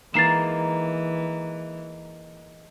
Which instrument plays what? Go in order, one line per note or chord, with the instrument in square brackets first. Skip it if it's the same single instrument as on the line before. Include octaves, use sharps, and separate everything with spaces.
[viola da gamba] E3 [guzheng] G#3 A#3 D#4 [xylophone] A6 C7 E7